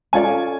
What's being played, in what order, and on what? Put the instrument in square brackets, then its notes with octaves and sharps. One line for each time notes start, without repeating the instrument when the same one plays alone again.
[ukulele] C#4 F4 A4 D5 [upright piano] G#5